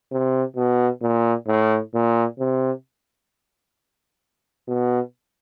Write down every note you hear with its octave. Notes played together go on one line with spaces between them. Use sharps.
C3
B2
A#2
A2
A#2
C3
B2